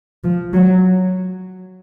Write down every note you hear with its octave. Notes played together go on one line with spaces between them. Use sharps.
F3
F#3